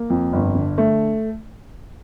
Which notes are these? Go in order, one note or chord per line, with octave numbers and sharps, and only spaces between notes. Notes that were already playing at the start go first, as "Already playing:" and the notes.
Already playing: A#3
F2
G1
D3
A3